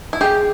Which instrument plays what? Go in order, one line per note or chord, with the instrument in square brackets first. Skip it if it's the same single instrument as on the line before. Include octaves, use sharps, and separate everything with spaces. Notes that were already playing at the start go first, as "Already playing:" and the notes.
[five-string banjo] E4
[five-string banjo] G4 [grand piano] G#4